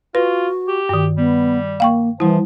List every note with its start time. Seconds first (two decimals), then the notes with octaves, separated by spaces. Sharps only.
0.15 F4 F#4 B4
0.68 G4
0.89 G2 D#3
1.17 G3 B3
1.80 A#3 F5 G5 C#6
2.20 E3 F3 G3 E4